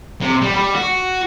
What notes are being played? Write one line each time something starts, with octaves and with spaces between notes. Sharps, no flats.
C3
G3
G3
F#4